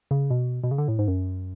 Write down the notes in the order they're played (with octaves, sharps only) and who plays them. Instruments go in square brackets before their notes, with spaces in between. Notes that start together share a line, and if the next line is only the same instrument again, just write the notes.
[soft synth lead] C#3
B2
B2
C#3
D3
A2
G#2
F#2